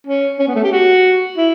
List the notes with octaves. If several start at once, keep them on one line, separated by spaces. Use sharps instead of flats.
C#4
C#4
B3
A3
G4
F#4
E4